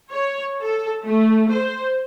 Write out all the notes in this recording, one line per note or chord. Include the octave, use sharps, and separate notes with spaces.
C#5
A4
A3
C5